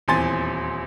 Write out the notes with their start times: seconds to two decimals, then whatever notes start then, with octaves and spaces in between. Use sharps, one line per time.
0.08 D#1 E2 C4 G#5 C6 A6